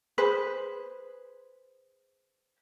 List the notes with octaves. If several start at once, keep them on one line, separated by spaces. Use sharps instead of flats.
G#4 B4 C5